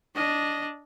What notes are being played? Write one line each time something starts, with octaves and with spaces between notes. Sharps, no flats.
D4 D#5